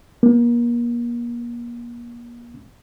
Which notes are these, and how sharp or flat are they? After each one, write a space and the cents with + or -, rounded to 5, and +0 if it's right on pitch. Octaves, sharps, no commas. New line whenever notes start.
A#3 +35